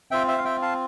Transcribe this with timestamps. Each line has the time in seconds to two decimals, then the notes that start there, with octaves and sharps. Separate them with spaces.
0.11 C4 F4 E5 G5
0.28 C5 E5
0.38 F5
0.45 E5 G5
0.62 F5 A5